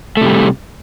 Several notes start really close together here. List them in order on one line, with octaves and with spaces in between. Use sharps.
A3 C3 G3